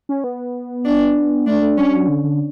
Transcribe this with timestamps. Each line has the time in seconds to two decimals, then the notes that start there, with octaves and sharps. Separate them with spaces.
0.09 C#4
0.24 B3
0.85 D4
1.47 A3 D4
1.62 A3
1.77 G3 C#4
1.93 F#3
2.08 D3
2.23 D3